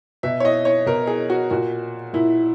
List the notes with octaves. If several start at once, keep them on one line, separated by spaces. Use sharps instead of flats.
B2 E5
C#5
D#5
C#5
B2 A#4
G#4
F#4
A#2 F#4
A#2 E4